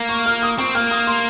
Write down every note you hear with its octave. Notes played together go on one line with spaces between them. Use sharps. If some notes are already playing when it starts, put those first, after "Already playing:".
Already playing: A#3
C#6
F6
D#6
C4 C#6
A#3 F6
D#6
C6